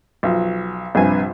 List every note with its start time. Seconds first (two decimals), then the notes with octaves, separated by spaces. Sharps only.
0.23 B1 F3
0.95 A#1 G2 C3 B4 G#5